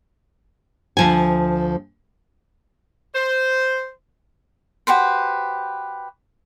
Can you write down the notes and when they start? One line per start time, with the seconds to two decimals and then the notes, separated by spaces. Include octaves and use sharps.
0.97 D2 F3 G#5
3.15 C5
4.87 F#4 G4 B4 C5